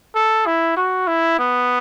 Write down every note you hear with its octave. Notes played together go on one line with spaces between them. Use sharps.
A4
E4
F#4
E4
B3